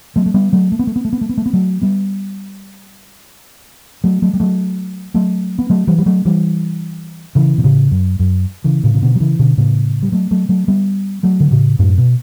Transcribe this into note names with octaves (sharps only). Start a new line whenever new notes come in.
F#3 A3
A3
G3 B3
F#3 A3
A3
B3
A3
B3
A3
B3
A3
B3
A3
B3
F#3 A3
G3 B3
F#3 A3
F#3 A3
G3
F#3 A3
F#3 A3
B3
F#3 A3
E3 G3
G3
F#3 A3
E3 G3
C#3 E3
B2
A2 C#3
F#2
F#2
C#3 E3
A2 C#3
C#3
B2 D3
F#3
C#3 E3
B2 D3
A2 C#3
G3
F#3 A3
F#3 A3
F#3 A3
G3 B3
F#3 A3
D3
A2 C#3
F#2 A2
B2